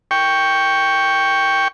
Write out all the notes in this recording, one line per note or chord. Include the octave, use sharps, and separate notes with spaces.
G5 C#6